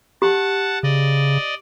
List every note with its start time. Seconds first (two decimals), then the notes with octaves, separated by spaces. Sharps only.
0.22 G4 F#5 A5
0.83 C#3 D5 D#5